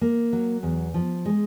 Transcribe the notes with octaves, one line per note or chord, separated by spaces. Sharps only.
A#3
F#3
E2
F3
G#3